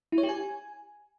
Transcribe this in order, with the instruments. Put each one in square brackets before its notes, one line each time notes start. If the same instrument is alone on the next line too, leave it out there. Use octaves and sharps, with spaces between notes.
[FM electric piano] E4
C#5
G4
G#5